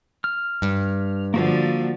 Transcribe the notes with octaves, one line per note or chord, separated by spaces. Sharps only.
F6
G2
D3 F3 A#3 F#4 D5